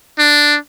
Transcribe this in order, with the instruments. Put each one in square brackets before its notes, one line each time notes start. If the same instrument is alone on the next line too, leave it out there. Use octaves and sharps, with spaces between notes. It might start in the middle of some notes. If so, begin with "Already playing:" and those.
[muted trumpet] D4